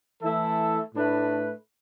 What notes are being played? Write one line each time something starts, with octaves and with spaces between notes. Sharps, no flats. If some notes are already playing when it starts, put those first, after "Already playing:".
E3 A3 E4 A4 E5
A2 A3 D4 B4